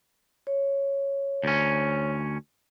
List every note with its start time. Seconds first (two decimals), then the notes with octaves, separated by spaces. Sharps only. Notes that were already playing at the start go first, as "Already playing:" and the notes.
0.47 C#5
1.44 D2 C#4